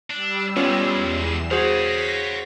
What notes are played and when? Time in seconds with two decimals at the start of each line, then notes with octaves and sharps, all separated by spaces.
0.11 G3 D4 E6
0.57 B2 G#3 B3 C#4 F4
0.94 E2 C7 E7
1.51 F#4 G#4 C5 C#5 F5 A#6 B6